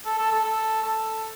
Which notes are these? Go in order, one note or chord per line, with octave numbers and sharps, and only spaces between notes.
A4
A4
A4
A4
A4